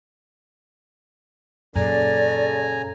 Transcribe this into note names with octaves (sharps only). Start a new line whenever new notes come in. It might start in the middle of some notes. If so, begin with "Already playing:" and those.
F#2 A#2 C#3 A4 D5 G#5 A#5